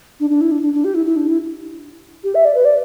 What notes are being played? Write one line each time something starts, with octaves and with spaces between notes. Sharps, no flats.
D4
D4
E4
D4
D4
D4
G4
E4
E4
D4
E4
G4
E5
D5
B4
D5